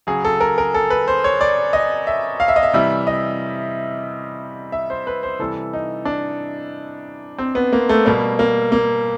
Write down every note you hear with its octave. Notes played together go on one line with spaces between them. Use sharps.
C#3 F#3 G#4
A4
A#4
A#4
A4
B4
C5
C#5
D5
D#5
E5
F5
E5
D#5
E5
C3 E3 G3 E5
D#5
E5
C5
B4
C5
C3 E3 G3 A4
D#4
D4
C4
B3
A#3
A3
B2 G3 A#3
A#3
A#3